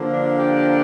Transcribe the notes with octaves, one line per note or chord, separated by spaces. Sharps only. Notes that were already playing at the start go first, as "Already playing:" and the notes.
Already playing: D3 F3 A#3
D4
D4 G4